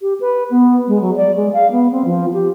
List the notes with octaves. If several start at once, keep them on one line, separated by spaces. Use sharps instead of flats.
G4
B4
B3
G#3
F#3
D5
G#3
F5
B3
C4
F3
G4